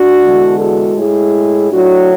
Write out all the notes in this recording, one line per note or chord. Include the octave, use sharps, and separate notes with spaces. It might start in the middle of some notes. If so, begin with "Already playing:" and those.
Already playing: D4 F#4
E2 D3 G#3
F#4 A4
A2 G#3 E4 G#4
A2 F#3 D4 F#4